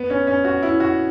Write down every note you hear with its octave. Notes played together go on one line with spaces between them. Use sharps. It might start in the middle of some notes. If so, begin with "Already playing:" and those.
Already playing: B3
C#4
C#4
F#4
E4
F#4